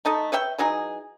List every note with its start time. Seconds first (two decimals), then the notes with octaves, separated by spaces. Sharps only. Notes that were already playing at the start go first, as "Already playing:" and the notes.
0.05 A3 D#4 A4 D#5
0.32 B4 C#5 E5 G5
0.58 E3 F#3 D#4 G#4